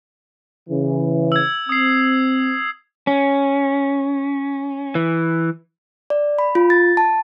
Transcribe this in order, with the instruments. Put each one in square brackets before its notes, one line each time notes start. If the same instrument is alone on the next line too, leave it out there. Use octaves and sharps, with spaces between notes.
[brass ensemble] C#3 E3
[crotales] E6 G#6
[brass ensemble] C4 [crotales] D#6 C7
[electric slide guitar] C#4
E3
[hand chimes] D5
B5
F4
A6
A5